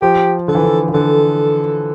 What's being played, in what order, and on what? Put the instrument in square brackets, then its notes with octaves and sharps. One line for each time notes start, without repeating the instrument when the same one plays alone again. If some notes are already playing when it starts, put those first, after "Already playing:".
[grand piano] F3 [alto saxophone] G4
[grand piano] D3 [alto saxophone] A4
[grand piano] E3
D3
E3
[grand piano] D3 [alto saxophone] A4